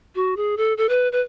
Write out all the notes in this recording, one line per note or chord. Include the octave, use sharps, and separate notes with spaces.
F#4
G#4
A4
A4
B4
B4